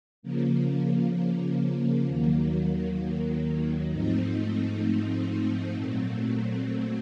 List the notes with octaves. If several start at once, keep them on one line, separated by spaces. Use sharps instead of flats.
C#3 F3 A#3
D#2 D#3 F#3 A#3
G#2 F3 A3 C4 D#4
A#2 F#3 A3 C4